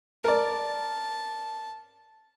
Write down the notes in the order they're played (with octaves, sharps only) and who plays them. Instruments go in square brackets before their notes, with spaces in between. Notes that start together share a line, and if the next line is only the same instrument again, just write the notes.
[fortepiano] A#4 D5 [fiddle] A5